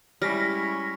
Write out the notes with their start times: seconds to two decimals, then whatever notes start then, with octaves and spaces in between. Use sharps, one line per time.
0.22 G3 G#3 C#4 E4 F6 A#6 B6